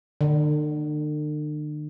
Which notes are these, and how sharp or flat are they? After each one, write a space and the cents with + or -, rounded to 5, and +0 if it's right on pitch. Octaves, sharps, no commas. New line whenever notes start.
D3 +45